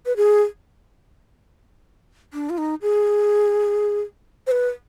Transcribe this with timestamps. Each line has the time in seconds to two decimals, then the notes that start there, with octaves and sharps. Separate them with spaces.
0.06 B4
0.16 G#4
2.33 D4
2.50 F4
2.58 D#4
2.82 G#4
4.47 C5
4.51 B4